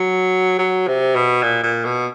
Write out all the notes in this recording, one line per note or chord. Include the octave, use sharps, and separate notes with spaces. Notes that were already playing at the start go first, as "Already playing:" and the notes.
Already playing: F#3
F#3
C3
B2
A#2
A#2
B2